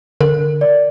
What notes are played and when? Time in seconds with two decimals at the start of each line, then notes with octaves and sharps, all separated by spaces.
0.21 D3 A#4
0.61 D5